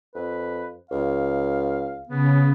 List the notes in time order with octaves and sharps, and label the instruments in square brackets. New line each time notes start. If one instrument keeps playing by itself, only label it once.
[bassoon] F2 [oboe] B4
[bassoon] C#2 [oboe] F5
[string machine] C#3 [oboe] B3